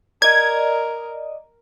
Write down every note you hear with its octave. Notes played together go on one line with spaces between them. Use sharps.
A#4 D5 D#5 G#6